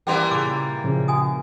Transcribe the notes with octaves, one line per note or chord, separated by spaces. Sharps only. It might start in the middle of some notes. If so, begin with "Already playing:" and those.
E3 G3 A#3 G5 C6 E6
A#2 C#3 C6 D6
A#2 C#3 F3
F#4 G#5 D#6